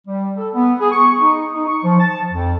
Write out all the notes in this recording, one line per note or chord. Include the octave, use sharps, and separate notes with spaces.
G3
A4
B3
G#4
C#6
D#4
D#4
C#6
F3
A5
F2